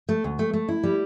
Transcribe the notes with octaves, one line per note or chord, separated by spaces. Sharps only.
A3
D2
A3
A3
E4
G3